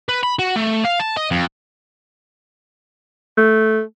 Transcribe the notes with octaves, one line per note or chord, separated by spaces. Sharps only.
B4
B5
F#4
A3
F5
A5
D#5
F2
A3